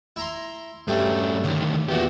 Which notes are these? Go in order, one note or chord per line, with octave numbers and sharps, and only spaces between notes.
E4 A#5 C6
G2 G3 A3 C#4
D2 D#3 C#5
E2 A#2 F#4 G4